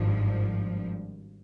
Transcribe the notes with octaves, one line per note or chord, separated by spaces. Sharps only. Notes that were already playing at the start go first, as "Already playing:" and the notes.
Already playing: G#1 G2 F3